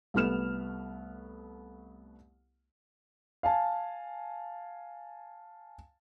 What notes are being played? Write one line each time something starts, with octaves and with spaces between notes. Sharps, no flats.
C2 A3 B3 F6 E7
F5 G#5 A5